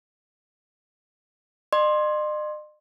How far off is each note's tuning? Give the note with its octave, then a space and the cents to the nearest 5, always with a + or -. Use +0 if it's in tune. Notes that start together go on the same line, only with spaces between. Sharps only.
D#5 -45 C6 +15